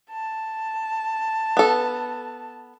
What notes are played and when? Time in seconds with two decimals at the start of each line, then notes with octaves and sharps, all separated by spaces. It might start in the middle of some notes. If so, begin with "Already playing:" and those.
0.11 A5
1.57 B3 A4